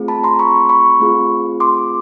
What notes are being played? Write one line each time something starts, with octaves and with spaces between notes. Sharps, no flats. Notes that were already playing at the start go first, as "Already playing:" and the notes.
Already playing: A3 C4 F4 G#4
A5 B5
A#5 C6
B5 C#6
B5 C#6
A3 C4 F4 G#4
C6 D6